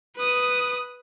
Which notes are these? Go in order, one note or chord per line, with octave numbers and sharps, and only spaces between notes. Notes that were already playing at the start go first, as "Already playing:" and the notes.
B4 D#6